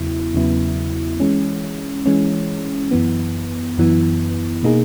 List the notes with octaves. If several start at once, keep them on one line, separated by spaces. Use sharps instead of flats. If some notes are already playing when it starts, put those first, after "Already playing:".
Already playing: E2 C#3 F#3 B3 E4
E2 C#3 F#3 B3 E4
E3 G#3 C#4
E3 G#3 C#4
F#2 E3 B3
F#2 E3 B3
B2 A#3 D#4 G#4